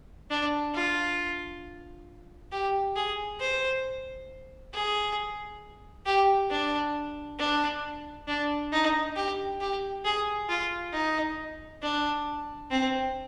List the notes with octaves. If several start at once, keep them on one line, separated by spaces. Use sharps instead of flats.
D4
F4
G4
G#4
C5
G#4
G4
D4
D4
D4
D#4
G4
G4
G#4
F4
D#4
D4
C4